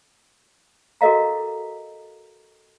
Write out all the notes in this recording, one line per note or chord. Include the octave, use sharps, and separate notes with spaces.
F#4 A4 A#4 D#5 F5 A#5